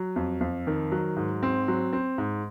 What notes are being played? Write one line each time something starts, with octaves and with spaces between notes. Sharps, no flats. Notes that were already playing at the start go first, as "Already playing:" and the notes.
Already playing: F#3
F2
F2
D#3
F#3
G#2
C4
F#3
C4
G#2